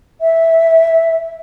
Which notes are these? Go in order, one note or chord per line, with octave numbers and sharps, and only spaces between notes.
E5